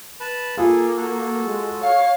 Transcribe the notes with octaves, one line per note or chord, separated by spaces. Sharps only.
B4 A5 B5
A#3 F4 G#4 A4
F#4 A4
G#3
C#5 F5